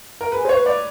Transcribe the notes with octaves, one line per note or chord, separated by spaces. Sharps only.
A#4
G#4 B4
C5 C#5
B4
D5